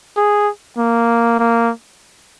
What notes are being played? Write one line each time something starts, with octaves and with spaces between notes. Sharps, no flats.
G#4
A#3
A#3